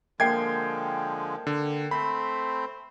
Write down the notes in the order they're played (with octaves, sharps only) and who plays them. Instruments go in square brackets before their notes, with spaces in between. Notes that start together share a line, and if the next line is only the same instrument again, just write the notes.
[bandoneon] D3 F3 G#3 [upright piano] A#3 G5 C7 [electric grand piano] G#6
[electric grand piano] D3
[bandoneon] A3 C4 C5 [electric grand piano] B5